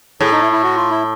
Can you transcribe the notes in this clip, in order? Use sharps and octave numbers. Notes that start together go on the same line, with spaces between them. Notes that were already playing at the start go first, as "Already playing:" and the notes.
A2 G#4
D#4
E4
E4
F#4
F4
E4